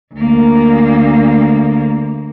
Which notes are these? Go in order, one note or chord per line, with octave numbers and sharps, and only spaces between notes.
D2 A#3